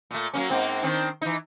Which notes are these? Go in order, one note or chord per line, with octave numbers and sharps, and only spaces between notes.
A#2 A3
F#3 A#3 C#4
G#2 A#3 C4
D#3 C4 D4
E3 D#4